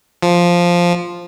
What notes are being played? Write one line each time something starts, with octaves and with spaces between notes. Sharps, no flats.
F3